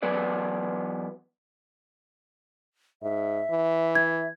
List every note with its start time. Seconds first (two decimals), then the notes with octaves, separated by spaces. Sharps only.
0.03 E2 F#3 B3 B4 D5
3.02 G#2 E5
3.50 E3
3.95 G#6